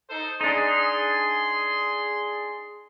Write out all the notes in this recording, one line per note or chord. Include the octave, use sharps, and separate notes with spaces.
D#4 A4 C5
D4 D#4 G#4 C6